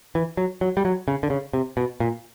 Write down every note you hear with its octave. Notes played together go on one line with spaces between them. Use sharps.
E3
F#3
F#3
G3
F#3
C#3
D3
C#3
C3
B2
A#2